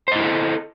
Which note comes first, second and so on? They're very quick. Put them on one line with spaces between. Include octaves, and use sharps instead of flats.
C5 D#5 E4 A#4 A4